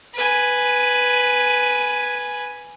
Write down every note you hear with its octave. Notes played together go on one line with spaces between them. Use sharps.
B4 G#5